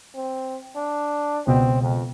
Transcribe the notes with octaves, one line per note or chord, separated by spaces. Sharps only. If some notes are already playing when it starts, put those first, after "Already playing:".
C4
D4
C#2 B2 C4
F2